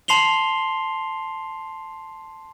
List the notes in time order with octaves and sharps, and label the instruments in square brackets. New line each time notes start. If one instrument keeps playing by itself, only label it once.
[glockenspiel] A5 C6 C7 F7 G7